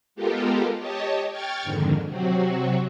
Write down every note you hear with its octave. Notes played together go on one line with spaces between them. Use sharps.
G#3 B3 F4 G4 A4 A#4
G4 C#5 D#5 A5
G5 C#6 F6 G#6 A6
F2 G#2 D3 D#3
C3 F#3 C4 F#4